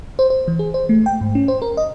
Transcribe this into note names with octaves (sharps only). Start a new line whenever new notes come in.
C5
C5
E3
G#4
C5
A3
G5
G#2
C#4
C5
A#4
D#5